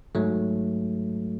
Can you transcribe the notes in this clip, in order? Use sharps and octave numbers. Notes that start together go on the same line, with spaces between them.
G#2 F#3 A3